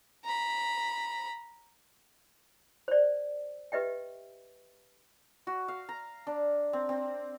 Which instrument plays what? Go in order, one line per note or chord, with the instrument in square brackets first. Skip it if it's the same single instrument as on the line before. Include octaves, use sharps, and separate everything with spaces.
[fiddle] A#5 B5
[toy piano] C5 D5
G4 B4 D#5 E5 G5
[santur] F#4
F5
A#5
D4
C4
C4